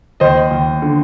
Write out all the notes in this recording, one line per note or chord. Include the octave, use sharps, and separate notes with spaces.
D#2 C5 D#5
D#2
D3